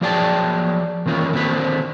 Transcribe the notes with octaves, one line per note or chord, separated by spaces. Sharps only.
F3 F#3 G#4 D5 G5 A5
D#3 E3 C#4 E4 F4
D3 D#3 C4 F#4 B4 C5